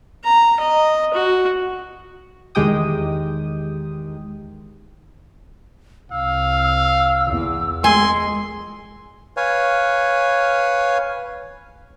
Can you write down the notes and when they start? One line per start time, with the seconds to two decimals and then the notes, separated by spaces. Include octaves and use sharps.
0.24 A#5
0.60 D#5
1.14 F#4
2.55 E2 D#3 G#3 G4 G5 D#6
6.11 C2 F5 E6
7.27 E2
7.84 G#3 G#5 C6
9.37 B4 C#5 F5 G#5